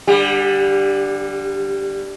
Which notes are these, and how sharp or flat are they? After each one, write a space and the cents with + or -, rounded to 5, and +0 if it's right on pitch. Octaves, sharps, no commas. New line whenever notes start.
D3 +0 G3 +0 G4 +35